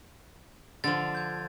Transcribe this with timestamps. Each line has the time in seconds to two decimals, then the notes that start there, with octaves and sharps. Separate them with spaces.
0.84 D3 F3 A6
1.15 G6 G#6